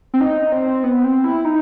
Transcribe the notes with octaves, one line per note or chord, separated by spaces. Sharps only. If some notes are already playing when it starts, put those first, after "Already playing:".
C4
D#4
C4
B3
C4
E4
D#4